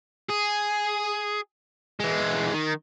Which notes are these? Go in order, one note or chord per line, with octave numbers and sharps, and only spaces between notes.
G#4
E3 G#3
D#3